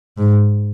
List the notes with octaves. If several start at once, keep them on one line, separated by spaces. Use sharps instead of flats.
G#2